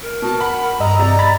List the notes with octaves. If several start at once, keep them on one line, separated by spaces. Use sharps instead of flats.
A#4
B2 A5
F#5 B5
G2 D#5 A#5 E6
C3 D5
B5 A6